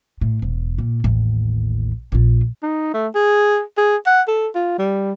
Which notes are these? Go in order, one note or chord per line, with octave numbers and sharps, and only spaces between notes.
A2
E1
A#2
A1 D#2
A#1 F4
D#4
A3
G#4
G#4
F#5
A4
F4
G3